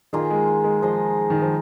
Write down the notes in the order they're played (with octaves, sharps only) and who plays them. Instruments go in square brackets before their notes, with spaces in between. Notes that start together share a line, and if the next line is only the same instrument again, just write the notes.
[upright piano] D#3 [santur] A#3 F4 G#4 D#5
[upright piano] G#3
G#3
[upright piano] F3 [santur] D#4 G#4 D#5
[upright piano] D#3
F3